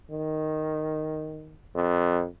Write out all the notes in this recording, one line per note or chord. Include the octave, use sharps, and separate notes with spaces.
D#3
F2